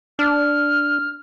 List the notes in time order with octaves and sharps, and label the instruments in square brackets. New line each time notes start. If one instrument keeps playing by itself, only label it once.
[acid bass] D4 [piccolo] F6